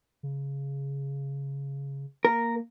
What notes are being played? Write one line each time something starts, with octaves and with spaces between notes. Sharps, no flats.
C#3
A#3 A#4